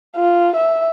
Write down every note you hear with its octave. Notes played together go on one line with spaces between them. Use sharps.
F4
E5